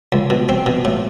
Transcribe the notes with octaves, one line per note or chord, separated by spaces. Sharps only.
C#2
B2
C4
B2
A2